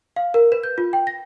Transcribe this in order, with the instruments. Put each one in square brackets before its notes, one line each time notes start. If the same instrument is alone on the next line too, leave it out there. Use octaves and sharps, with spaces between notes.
[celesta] F5
A#4
B4
G6
F4
G5
A#6